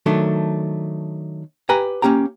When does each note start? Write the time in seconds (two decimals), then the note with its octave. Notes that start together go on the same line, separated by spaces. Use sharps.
0.06 D#3 F#3 A3 D4
1.69 G4 B4 G#5 A#5
2.02 A#3 C#4 G4 G5 A#5